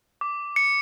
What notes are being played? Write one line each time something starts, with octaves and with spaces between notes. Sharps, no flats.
D6
C#7